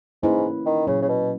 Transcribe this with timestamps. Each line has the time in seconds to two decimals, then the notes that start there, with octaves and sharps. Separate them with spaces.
0.23 G#2 A#3 C#4 E4 B4
0.66 D#3
0.87 A#2 C#3 F#3 C#4
1.02 C#3
1.08 B2